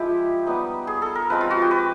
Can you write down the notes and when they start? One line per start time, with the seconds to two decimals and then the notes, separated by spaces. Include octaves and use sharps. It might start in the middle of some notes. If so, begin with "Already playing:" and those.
Already playing: F3 G#3 E4 G4
0.46 G3 B3 D#4
0.87 G#4
1.02 A4
1.15 A#4
1.30 F3 G#3 C4 B4
1.41 F4
1.51 F#4
1.62 G4
1.71 B4